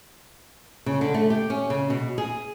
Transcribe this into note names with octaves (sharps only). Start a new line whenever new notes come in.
C#3
D3
A3
G4
C#4
C#3
B2
G#4